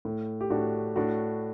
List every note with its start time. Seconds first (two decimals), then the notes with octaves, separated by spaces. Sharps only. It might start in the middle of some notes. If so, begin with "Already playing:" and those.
0.05 A2
0.41 G4
0.50 A2 D4 F#4
0.96 A2 D4 F#4